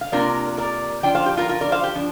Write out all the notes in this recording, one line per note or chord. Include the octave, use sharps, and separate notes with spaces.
F5
C3 A#3 D4 F4 A#4 D5
A#4 D5
F3 D4 F4 D5 G5
C5 F5
G4
F4 A#4
F4 A#4
A#4 D5
C5 F5
G4
F3 D4